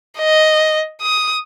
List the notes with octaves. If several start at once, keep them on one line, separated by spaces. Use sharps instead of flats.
D#5
D#6